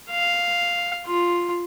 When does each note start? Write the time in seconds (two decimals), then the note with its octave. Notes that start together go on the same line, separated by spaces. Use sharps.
0.11 F5
1.06 F4